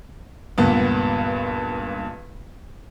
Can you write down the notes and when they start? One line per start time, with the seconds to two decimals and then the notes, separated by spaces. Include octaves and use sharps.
0.58 C#2 G2 A#2 B3